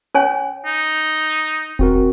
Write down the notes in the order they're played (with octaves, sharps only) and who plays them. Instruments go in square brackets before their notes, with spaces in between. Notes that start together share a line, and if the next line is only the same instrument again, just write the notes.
[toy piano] C#4 C#5 G#5
[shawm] D#4
[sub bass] E1 [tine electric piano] C4 F#4 A#4